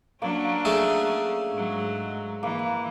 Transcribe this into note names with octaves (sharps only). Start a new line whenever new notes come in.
F#3 A#3 C#4 D4
A3 G#4 C#5
G#2 F#3
E3 A#3